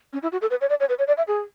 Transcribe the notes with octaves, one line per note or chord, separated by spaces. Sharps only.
C#4
E4
F#4
A4
B4
C#5
D5
C#5
B4
C#5
D5
E5
G#4